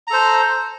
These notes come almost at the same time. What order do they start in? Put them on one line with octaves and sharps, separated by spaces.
A#5 A4 C5